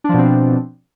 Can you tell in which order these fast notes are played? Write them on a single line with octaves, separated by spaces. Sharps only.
D4 F3 B2 C4